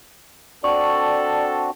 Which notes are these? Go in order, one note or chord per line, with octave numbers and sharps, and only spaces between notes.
C4 D4 F#4 A4 D5 C#6